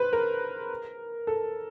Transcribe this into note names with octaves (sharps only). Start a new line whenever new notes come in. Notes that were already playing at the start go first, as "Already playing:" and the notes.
Already playing: B4 C5
A#4
A4